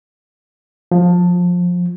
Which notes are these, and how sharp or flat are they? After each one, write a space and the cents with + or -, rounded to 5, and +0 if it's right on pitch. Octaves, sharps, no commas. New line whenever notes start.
F3 +20